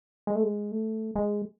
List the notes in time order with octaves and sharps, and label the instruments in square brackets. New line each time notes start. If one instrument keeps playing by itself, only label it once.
[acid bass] G#3
A3
G#3
A3
G#3